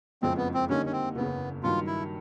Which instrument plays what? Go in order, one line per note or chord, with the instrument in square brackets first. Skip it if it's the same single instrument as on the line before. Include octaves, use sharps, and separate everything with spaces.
[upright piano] F#1 F2 C#3 F3 G#3 [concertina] C4
[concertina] B3
C4
[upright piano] D3 G3 A#3 D#4 [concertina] C#4
[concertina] C#4
C4
[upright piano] F#1 E2 C#3 [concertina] B3
[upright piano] G2 D#3 F#3 [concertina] F4
[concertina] E4